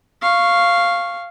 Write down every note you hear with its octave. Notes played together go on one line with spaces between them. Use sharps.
F5 C#6